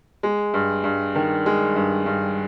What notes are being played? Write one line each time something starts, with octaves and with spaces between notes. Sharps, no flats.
G#3
G2
G2
D#3
G#3
G2
G2